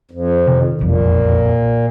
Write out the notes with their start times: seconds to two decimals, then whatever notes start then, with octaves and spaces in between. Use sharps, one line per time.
0.11 F2
0.47 C3 D#3
0.81 E1 B1 F2 A#2